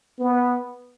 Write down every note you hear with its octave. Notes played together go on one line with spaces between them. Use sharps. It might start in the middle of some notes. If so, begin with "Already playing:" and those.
B3